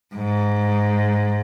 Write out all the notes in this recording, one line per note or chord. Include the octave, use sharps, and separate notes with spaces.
G#2